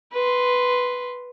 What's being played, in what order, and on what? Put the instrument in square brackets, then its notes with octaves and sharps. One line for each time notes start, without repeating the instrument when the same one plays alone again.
[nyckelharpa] B4 C6